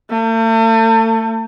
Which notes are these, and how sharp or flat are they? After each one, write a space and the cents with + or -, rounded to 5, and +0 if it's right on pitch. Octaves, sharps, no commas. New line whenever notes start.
A3 +40